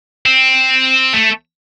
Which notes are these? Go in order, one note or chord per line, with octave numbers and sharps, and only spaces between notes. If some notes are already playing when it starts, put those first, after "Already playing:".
C4
A3